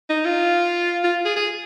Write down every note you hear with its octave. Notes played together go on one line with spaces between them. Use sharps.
D#4
F4
F4
G#4
G#4